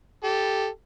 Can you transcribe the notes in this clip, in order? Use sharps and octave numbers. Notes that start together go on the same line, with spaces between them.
G4 A4